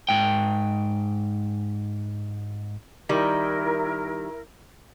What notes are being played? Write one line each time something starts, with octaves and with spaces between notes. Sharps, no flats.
G#2 G5
D#3 G3 E4 A#4